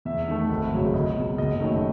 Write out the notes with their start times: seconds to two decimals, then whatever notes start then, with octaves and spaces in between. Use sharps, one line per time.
0.05 E2 E5
0.28 D#3 A3
0.49 G#1
0.72 F#2 C#3 F#3 A3
0.94 C#2 D#5
1.16 B2 G#3
1.38 F#1 D#5
1.60 F#2 D#3 A3